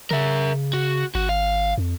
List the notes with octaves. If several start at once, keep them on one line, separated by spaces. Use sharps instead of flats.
C#3 A#4 E5
F#4
G#1 F#4
F5
F2